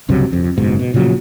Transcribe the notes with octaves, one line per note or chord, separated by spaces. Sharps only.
C#2 G2 C3 F#3
F2
F#1 G#2 B2
B2
A#2 C#3 F3 F#3